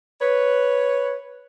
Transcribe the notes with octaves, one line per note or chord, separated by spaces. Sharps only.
B4 C#5